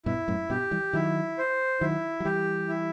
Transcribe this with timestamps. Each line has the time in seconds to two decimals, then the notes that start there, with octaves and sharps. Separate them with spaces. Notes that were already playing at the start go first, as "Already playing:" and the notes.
0.06 G2 B2 E4
0.28 F#2 A2
0.50 G2 B2 G4
0.71 E3 G3
0.93 D#3 F#3 E4
1.38 C5
1.81 D#3 F#3 E4
2.20 F#3
2.25 E3 G3 G4
2.68 E4